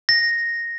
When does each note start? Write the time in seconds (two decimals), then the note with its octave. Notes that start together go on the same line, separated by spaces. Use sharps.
0.09 A#6